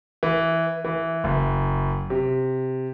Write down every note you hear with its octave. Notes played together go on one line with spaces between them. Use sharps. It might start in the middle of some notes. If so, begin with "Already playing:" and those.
E3
E3
F#1
C3